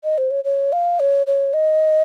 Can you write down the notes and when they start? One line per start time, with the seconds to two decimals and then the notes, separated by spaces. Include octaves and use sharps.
0.04 D#5
0.18 C5
0.31 C#5
0.45 C#5
0.73 F5
1.00 C#5
1.27 C#5
1.54 D#5